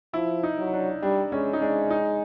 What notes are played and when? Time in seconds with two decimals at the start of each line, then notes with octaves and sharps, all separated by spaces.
0.14 F3 E4
0.43 D#4
0.58 F#3
0.73 D4
1.03 G3 D4
1.32 G#3 C#4
1.53 D#4
1.61 G#3 D4
1.90 D#4